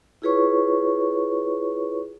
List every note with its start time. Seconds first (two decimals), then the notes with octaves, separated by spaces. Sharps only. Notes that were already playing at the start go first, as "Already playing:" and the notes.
0.22 E4 F4 G#4 B4 C#5 C#6